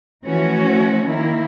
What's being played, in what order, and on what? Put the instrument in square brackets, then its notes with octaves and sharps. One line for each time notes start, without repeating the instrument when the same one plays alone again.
[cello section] E3 F3 A3 C#4 F#4
D#3 A#3 E4